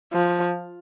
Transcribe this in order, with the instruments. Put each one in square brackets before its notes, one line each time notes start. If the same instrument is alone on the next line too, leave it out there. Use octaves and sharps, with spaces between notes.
[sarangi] F3